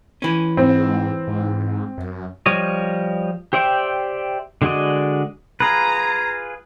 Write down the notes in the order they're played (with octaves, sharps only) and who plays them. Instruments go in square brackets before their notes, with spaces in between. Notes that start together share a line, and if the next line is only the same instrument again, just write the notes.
[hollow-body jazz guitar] E3 C#4
[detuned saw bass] G#2 [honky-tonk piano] C4
[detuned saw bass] G#2
F#2
[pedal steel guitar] F3 G3 C#5 D#5
G4 C5 D5 E5 G5
D3 G#3 F#4 D5 D#5
[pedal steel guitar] F4 G#4 B4 [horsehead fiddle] A#5